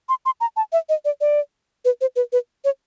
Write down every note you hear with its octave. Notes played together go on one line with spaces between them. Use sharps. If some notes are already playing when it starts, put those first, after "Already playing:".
C6
C6
A#5
A5
E5
D#5
D5
D5
B4
C5
B4
B4
C#5